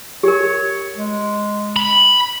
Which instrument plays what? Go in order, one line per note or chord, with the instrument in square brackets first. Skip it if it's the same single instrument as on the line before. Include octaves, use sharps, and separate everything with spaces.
[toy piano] G4 A#4 [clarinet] C#5
[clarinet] G#3
[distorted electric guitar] B5